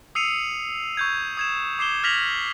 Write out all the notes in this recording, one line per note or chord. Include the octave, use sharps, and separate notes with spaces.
D#6 E6 C7 C#7 D#7 F7
C#6 G6 G#6
D#6 G#6 E7
D6 C7 E7 G7
F6 G#6 A#6 B6 F7 F#7